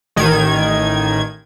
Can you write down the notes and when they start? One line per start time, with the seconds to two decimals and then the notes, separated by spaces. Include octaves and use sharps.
0.16 A1 D#3 G#6